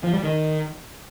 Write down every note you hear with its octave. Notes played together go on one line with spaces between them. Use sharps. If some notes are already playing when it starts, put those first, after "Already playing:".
F3
G3
D#3